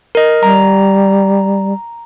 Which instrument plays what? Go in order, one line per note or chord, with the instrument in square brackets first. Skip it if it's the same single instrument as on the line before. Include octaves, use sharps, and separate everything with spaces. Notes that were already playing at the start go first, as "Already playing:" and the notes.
[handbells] A#4 D#5
[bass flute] G3 [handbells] A#5